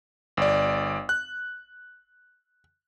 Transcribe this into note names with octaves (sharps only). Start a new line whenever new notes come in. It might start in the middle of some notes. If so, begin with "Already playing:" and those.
G1 D5
F#6